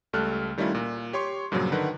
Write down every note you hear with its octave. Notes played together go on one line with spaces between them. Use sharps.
C#2 G3 A3 A4 F6 F#6
D#3 G3 A3 C#4 E4 F4
A#2
G4 C#5 C6 C#6
G2 A#2 C#3 F3 F#3
D3 D#3 B4 F#5